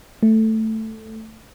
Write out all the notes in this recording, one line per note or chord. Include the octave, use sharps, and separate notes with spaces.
A3